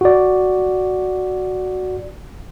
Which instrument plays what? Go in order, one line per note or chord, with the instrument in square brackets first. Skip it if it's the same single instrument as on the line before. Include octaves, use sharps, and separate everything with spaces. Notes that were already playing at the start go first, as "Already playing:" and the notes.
[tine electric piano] F#4 D5